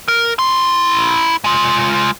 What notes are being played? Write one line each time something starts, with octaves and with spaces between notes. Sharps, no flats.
A#4
E4 C6
G#3 F4